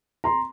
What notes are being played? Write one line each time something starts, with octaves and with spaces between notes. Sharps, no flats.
A#5 C6